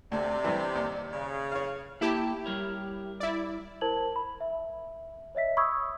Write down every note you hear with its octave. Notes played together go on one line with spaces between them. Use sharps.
D2 C3 D5
G2 E3
D#2
C#3
C#5 F5
A#3 E4 G4 A5
G3 A#4 C#5
E4 D5
E4 A#4 C5 A5 G#6 F#7
B5
E5
C#5 D#5 E5 B6
B5 C#6 D#6 E6 G#6